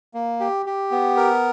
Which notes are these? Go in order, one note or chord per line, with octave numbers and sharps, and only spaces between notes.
A#3
G4
G4
B3
A#4